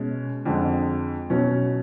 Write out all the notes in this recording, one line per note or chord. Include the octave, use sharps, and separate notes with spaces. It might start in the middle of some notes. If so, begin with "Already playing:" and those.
Already playing: B2 G#3 C#4
F2 D3 G#3
B2 F#3 C#4